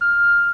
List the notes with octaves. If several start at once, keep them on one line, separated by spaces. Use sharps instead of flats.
F6